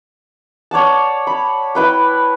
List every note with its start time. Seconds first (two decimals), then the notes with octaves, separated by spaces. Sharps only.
0.71 C#5 D5 F#5 A5
1.27 B5
1.75 E4 B4 G5